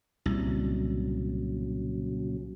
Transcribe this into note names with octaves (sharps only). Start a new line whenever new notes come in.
C2 A#2 C#3 F#3